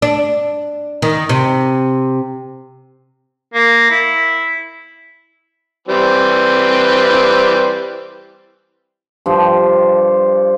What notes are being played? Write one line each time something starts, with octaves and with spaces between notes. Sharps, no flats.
D4
D#3
C3
A#3
E4
E3 G3 C4
G2 F3